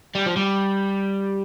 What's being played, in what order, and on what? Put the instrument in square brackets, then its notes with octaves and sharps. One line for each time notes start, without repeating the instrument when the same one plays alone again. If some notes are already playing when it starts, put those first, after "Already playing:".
[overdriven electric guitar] G3
F3
G3